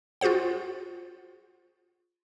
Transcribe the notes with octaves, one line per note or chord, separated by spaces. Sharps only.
F4 F#4 G#4 C5 F#5